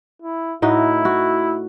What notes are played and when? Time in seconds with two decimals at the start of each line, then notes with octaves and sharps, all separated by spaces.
0.22 E4
0.62 A2 D#4 E4 F#4
1.05 F#4